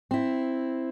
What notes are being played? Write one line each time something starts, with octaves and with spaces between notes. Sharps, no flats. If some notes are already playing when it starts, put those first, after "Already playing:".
C4 E4